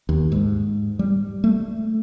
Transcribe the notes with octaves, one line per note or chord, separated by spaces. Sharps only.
D#2
G#2
G3
A3